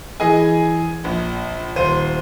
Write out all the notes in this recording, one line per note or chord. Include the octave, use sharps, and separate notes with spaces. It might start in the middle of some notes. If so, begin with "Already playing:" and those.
E3 G#4 D#5 G#5
A#1
D#1 C5 D#7